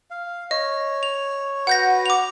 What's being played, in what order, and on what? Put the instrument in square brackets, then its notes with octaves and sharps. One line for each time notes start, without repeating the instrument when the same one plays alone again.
[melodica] F5
[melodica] C#5 [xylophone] D#5
[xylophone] F7
[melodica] F#4 B4 [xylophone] F#5 G6 A#6
[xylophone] D6 F7